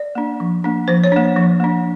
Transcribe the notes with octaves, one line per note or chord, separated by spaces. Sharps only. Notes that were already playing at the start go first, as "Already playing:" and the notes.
Already playing: D5
A#3 D4
F3
A#3 D4
F3 C5
C#5
A#3 D4
F3
A#3 D4